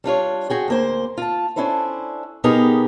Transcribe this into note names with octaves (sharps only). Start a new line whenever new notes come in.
G3 D4 F4 C#5
F#4 G#4 G5
D2 A#3 C5
F4 A5
C#4 D4 E4 A4 C5
B2 B3 D#4 G4 G#4 A#4